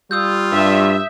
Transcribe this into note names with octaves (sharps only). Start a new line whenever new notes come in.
G3 F4 D#6 E6 G6
G2 E5